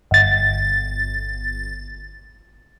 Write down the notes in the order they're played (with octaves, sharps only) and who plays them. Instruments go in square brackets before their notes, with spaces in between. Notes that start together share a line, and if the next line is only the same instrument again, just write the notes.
[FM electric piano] G1 A6